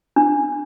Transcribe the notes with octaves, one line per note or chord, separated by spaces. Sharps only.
D4